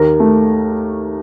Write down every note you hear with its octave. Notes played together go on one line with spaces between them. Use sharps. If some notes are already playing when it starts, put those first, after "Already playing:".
Already playing: D#2 A#4
A3